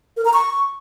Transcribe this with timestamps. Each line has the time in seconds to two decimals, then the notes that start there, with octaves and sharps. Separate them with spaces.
0.17 A#4
0.25 A#5
0.33 C#6